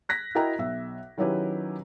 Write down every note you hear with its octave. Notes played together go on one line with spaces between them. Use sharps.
F#6 A#6 B6
E4 F#4 A#4 D#5 G5 A#5
B1 E5
D#3 F#3 C#4 E4 G4 B4